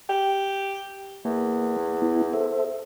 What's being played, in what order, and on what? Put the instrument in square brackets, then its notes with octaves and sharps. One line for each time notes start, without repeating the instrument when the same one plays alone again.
[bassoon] G4
[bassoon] E2 [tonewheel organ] A#3
[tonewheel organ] B3 E4
A4 C5 E5